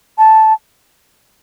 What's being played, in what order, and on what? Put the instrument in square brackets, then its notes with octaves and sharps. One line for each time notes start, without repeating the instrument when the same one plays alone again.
[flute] A5